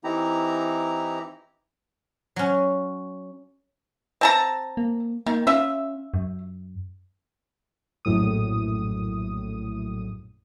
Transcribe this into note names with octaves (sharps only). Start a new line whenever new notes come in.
E3 C4 D#4 E4 G4 A#5
F#3 C#4
C4 A5 A#5
A#3
D#3 A#3
C#4 F4 E5
F#2
A#1 F#2 A2 D#6